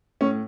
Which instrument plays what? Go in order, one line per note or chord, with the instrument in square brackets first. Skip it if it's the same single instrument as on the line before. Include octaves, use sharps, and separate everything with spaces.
[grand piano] A2 C#4